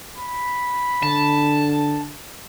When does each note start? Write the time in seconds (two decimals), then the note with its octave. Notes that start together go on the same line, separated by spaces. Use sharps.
0.18 B5
1.03 D3 A5